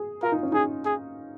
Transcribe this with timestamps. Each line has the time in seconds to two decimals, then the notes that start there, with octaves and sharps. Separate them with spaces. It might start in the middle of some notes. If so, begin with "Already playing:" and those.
Already playing: G#4
0.23 F4 A#4
0.32 D#4
0.43 C#4
0.52 D#4 G#4
0.85 G#4